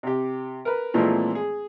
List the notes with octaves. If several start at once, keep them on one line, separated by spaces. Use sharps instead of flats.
C3 G4
A#4 B4
A#2 E3 F3 G#3 A3 C4
G#4